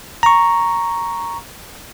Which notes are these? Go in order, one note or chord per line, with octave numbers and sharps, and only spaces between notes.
A#5 C#6